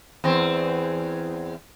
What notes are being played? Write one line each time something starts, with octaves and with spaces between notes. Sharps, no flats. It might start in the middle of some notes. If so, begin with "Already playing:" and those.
E2 C4